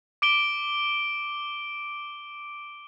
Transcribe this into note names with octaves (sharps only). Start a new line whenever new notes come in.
D6 D7 G7